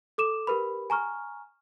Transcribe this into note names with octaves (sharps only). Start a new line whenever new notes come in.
A4 D6 E7
G4 A#4 B4 B5
G#5 A#5 C#6 F6